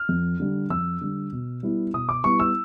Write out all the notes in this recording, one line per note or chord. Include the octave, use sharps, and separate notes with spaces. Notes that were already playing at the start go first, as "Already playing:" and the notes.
Already playing: F6
F2
D3 G3
F2 E6
D3 G3
B2
G3 B3 E4
B2 D#6
D6
G3 B3 E4 C#6
E6